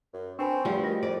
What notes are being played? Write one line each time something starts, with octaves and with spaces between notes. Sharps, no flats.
F#2
C4 D4 B4 G#5 B5 C#6
E2 F3 G3 A3 F#4
D#3 A#6
F2 D5